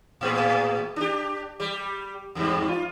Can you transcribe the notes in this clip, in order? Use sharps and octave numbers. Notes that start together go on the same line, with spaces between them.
A2 B3 G#4
D4 G4
G3 G4
E2 G#2 G3
F4